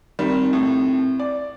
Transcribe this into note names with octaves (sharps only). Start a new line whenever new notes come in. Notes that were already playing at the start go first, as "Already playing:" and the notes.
D#3 G3 C4
A2
D5